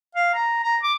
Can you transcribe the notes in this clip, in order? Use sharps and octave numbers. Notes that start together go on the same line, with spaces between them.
F5
A#5
A#5
D6